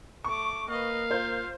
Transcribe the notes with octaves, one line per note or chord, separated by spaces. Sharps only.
A3 C#6 D6
A#3 B4 D#5 F5
F4 A#4 C5 G6